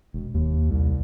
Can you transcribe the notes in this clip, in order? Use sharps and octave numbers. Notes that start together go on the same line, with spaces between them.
E1
D#2
C2